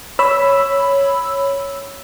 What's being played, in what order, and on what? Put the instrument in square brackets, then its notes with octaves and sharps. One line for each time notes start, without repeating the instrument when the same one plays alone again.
[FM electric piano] C#5 B5 E6